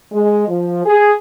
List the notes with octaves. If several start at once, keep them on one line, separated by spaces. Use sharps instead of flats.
G#3
F3
G#4